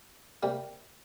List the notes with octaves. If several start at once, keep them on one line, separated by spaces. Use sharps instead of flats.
C3 G3 A#3